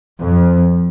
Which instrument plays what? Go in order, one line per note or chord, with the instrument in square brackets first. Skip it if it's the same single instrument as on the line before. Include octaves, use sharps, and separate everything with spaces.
[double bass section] F2